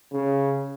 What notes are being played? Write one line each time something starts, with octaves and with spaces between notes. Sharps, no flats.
C#3